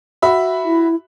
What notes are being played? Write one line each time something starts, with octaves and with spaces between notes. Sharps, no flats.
F#4 E5 B5
E4